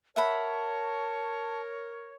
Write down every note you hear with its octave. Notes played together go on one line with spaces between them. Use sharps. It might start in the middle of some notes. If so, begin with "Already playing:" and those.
A#4 C#5 E5 F#5 A5 B5